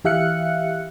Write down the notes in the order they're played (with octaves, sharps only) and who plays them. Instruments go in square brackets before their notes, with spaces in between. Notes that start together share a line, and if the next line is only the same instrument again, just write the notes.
[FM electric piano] E3 G4 E5 F5 F#6 C#7